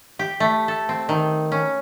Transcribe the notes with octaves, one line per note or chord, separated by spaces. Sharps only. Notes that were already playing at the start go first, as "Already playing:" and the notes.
G4
A3
A4
C4
D#3
C#4